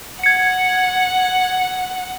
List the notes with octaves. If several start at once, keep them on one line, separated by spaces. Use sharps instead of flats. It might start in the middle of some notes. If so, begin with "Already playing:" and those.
F#5 G#6 C#7